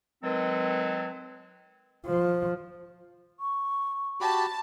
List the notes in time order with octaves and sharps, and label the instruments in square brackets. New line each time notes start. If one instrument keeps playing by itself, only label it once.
[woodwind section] D#3 F#3 G#3 C4 A4 B4
[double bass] F3
[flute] C#6
[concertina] F#4 G4 B5 [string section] A5